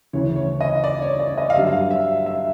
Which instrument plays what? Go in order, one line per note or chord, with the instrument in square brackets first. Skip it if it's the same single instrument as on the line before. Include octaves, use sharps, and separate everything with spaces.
[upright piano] D2 C#3 E3 C#5
C#5
D#5
D5
C#5
D5
D#5
F5
G2 D3 F#3 E5
F5
E5
E5